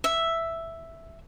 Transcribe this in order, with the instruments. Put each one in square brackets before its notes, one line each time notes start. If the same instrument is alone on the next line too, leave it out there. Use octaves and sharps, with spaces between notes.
[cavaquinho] E5